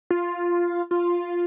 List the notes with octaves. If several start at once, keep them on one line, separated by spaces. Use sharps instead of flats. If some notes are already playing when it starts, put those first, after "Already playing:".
F4
F4